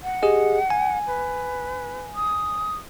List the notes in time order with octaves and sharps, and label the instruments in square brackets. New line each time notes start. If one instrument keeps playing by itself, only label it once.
[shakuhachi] F#5
[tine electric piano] G4 G#4 D#5
G#5
[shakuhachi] B4
D#6